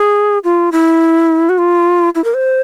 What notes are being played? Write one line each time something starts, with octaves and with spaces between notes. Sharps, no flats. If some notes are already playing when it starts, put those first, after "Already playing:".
Already playing: G#4
F4
E4
F#4
F4
E4
A#4
C5